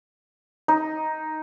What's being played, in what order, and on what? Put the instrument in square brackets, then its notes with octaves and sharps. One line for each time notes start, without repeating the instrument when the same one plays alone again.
[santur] D#4